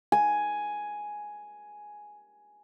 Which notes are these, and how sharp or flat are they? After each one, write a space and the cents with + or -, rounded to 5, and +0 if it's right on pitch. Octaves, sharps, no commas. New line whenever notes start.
G#5 +5